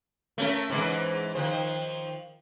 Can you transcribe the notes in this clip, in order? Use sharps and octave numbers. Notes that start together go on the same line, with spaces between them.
A3 C#4 A#4
G#2 D3 E3
D#3 F3 C5